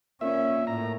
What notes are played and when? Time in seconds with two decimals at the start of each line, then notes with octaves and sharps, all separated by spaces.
0.21 A#2 C#4 E5
0.67 A2 A#5